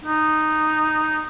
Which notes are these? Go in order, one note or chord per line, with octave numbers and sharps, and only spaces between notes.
D#4